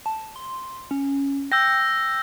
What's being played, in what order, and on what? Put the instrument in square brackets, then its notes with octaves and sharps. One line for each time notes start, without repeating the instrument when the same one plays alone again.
[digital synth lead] A5
C6
C#4
[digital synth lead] G5 [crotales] E6 G6 A#6